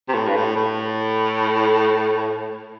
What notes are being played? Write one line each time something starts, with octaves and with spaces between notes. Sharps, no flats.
C3
A2
G2
A2
A2